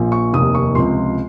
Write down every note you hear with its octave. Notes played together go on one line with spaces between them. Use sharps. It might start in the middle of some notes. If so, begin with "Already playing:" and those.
Already playing: A#1 A#2 F3
C#6
F1 D#2 D#3 D#6
C#6
C#2 C3 F3 C6